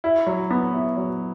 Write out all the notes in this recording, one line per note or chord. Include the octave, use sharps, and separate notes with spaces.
E4
F#3
B3
E4
F#3